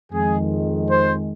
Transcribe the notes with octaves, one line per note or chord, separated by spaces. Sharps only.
F2 D#3 G#3 G#4
C5